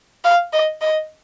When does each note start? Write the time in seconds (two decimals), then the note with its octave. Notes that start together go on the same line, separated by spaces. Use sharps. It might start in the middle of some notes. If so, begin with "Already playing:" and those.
0.24 F5
0.53 D#5
0.81 D#5